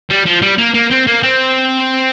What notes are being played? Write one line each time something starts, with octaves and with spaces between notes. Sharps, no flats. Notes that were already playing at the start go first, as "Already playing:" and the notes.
G3
F3
G3
A#3
A#3
C4
A#3
C4